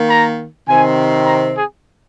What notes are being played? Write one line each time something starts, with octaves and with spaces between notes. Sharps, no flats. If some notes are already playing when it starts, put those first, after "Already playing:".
Already playing: D#3 A#3
A#5
C3 D#3 C4 G#5
A#5
G#4